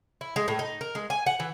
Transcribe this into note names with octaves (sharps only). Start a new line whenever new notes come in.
E4
G#3
A2
D#4
A#4
G#3
G#5
F#5
E3